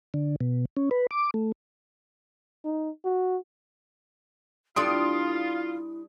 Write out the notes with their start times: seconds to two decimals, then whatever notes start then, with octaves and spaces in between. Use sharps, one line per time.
0.14 D3
0.41 B2
0.77 C#4
0.91 B4
1.11 D6
1.34 A3
2.65 D#4
3.05 F#4
4.76 G3 D4 E4 F4 A4 C6 D#6 D7